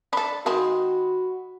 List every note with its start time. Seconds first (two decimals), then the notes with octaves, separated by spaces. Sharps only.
0.13 D4 A4 B5
0.46 D#3 G#3 C4 F#4